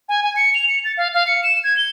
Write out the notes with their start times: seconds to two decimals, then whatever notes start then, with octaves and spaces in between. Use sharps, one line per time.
0.09 G#5
0.23 G#5
0.36 C#7
0.55 F7
0.69 C#7
0.84 A6
0.97 F5
1.14 F5
1.27 C#7
1.44 E7
1.64 G#6
1.77 G7